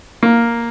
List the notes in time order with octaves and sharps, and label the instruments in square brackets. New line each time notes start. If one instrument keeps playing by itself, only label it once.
[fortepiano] A#3